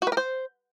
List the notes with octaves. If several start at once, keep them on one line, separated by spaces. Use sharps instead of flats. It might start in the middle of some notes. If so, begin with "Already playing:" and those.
F#4
B4
A#4
C5